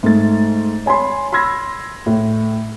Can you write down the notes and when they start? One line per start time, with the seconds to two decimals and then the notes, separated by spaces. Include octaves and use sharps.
0.03 G#2 A3 A6
0.86 C#5 G#5 B5 C6
1.32 B5 C6 E6 G#6 A#6
2.06 A2